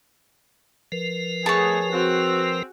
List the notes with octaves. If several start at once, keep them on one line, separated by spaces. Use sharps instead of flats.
F3 A#4 B4
A3 B3 G#4 C#5 A5
C4 F#4